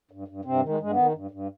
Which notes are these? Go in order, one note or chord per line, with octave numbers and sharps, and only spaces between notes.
G2
G2
G2 C3 C4
D#3
G#3
G2 G#3
B3
D#3
G2
G2